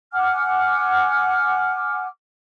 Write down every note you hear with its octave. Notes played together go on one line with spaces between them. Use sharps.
F#5 G#5 D6 F6